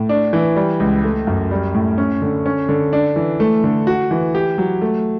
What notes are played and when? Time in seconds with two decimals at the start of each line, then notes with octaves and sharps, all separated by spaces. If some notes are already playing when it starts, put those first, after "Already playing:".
Already playing: A2
0.09 D4
0.33 E3
0.56 G3
0.80 C#2
1.04 A3
1.27 F#2
1.51 G3
1.74 A2
1.98 C#4
2.22 D3
2.46 C#4
2.69 D3
2.93 D4
3.16 E3
3.40 A3
3.64 D3
3.87 F#4
4.11 E3
4.35 G4
4.58 F#3
4.81 A3